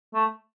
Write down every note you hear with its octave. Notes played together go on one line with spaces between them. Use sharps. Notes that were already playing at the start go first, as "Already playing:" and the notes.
A3